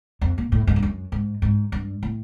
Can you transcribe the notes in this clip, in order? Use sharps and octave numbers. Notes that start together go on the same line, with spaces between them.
F2
A#2
A2
G#2
G2
F#2
G#2
G#2
G2
A2